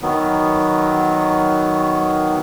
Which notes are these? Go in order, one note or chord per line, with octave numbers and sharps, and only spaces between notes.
D#3 F#3 B3